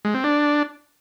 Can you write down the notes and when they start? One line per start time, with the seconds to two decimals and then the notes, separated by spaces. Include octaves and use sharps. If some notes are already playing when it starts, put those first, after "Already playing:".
0.05 G#3
0.14 C4
0.24 D4